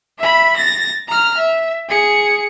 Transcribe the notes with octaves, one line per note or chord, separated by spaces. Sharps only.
E5 B5
A6 A#6
A#5 F6
E5
G#4 C#7